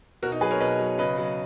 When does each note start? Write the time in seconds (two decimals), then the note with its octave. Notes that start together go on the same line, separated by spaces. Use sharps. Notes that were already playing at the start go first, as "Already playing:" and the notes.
0.22 B2 F#4 A#4
0.32 D#4
0.41 F#3 G#4 B4
0.51 A#4 C#5
0.60 B2 B4 D#5
0.80 F#3
0.98 C#3 B4 D#5
1.17 F#3